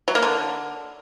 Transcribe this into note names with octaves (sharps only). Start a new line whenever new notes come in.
F#3
A#3
D3